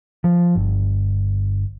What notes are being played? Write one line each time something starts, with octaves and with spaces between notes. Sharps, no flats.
F3
G1